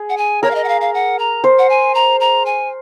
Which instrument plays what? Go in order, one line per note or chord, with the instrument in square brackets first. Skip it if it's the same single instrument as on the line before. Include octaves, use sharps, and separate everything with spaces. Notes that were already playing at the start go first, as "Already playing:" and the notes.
Already playing: [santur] G#4
[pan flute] F#5
G#5
[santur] A#4 [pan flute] C#5
[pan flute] F5
D#5
F#5
F5
F5
F#5
A#5
[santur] C5
[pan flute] F#5
G#5
A#5
A#5
G#5